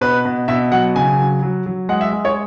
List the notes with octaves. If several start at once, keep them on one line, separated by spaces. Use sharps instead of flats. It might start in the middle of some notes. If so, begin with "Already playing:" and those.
B2 B4
B2
B2 E5
F#3 F#5
C#3 G#5
F#3
F#3
F#3
G#3 F#5
E5
G#3
C#5